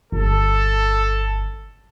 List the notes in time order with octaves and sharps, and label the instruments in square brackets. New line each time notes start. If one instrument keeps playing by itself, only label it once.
[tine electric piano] G1 [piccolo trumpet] A4